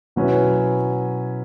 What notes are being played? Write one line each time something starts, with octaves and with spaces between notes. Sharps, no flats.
B2 F#3 C#4 E4 B4